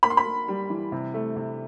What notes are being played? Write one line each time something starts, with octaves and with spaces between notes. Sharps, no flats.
A#3 B5
C6
B5
A#3
G3
E3
C3
A3
C3